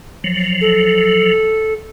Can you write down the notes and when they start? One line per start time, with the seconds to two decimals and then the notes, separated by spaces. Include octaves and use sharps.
0.24 F3 F#3
0.61 A4